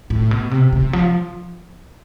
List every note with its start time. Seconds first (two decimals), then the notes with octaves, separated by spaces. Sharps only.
0.10 A2
0.31 B2
0.51 C3
0.73 C3
0.93 F3